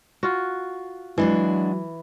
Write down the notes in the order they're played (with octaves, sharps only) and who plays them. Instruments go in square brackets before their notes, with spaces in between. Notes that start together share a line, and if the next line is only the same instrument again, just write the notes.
[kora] F4 F#4
[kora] E3 [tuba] F#3 [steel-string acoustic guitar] G#3 D4 F#4